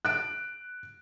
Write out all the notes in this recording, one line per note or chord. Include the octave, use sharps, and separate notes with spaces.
F#6 D7